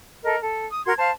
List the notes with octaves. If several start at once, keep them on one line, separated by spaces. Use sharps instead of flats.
A4 A#4 D#5
A4
D#6
F#4 A#4 C6 G#6
C5 F5 A5